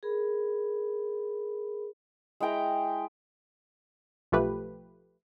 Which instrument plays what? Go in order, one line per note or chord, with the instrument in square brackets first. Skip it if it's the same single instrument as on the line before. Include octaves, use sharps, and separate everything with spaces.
[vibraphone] G#4 A#4 B5
[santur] G#3 E4 G5 A#5
[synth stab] B1 F3 A3 G4 B4